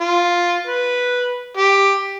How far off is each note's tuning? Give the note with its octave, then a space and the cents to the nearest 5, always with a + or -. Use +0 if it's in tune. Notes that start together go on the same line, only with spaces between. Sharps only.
F4 +5
B4 -5
G4 +10